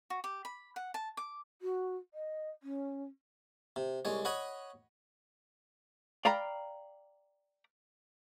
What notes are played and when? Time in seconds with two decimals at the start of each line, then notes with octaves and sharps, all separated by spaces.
0.10 F#4
0.24 G4
0.45 B5
0.76 F#5
0.94 A5
1.17 D6
1.61 F#4
2.14 D#5
2.63 C#4
3.76 C3
4.05 C2 G#3 C#5
4.25 C#5 D#5 F#5 B5 C#6
6.25 D5 F5 G5 A#5 B5